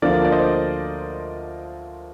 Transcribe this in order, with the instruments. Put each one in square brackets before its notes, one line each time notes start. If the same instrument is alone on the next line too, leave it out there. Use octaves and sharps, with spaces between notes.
[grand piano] D2 D3 F3 A#3 F4 [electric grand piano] A#4 D5
[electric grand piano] D5
C5 D#5